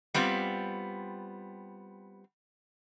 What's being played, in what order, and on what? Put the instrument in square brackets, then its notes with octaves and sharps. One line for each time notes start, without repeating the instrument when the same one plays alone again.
[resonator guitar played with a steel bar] G3 B3 C4 F4